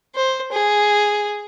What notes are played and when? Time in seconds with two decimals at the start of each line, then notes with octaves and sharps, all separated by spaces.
0.15 C5
0.52 G#4